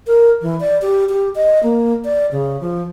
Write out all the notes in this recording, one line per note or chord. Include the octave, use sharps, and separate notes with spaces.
A#4
E3
D5
G4
G4
D#5
A#3
D5
C#3
F3